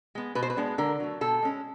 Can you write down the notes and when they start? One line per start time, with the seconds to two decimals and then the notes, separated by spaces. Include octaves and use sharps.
0.15 G#3 B3
0.35 B2 B4
0.43 C5
0.50 B4
0.57 G#3 B3 D4
0.78 D3 A#4
1.00 F#3 A3
1.21 B2 A4
1.42 G#3 C#4